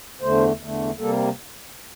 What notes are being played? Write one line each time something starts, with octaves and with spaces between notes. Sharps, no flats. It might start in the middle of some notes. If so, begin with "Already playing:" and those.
E2 D3 A3 C5
E2 D3 A3
C3 G3 A#3 A4